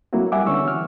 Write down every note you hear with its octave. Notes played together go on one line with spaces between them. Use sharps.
F#3 A3 A#3 C4 E4 F#4
G3 G4 E5 F#5 G#5 D6
D3 B3 C#4 C#6 E6
E3 F6